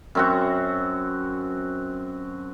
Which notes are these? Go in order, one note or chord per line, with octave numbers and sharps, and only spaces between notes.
F#2 C4 F#4